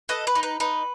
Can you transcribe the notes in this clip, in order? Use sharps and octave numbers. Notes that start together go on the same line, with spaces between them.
A4 B4 D#5
B4
D#4
B4
D#4 B4